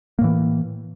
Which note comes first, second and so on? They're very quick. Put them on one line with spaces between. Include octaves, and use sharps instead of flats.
A#3 A2 E3